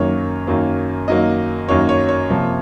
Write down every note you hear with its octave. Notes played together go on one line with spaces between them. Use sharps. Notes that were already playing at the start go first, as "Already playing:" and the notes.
Already playing: F#2 D#3 F#3 A#3 C#5
F#2 D#3 F#3 A#3
F#2 D#3 F#3 A#3 D#5
F#2 D#3 F#3 A#3 C#5
C#5
C#5
C3 F3 A#3